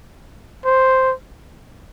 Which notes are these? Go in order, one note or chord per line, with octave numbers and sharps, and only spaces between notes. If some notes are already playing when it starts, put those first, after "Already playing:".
C5